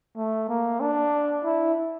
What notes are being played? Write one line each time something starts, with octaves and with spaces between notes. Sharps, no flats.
A3
A#3
D4
E4